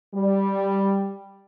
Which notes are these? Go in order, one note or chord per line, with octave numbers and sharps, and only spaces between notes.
G3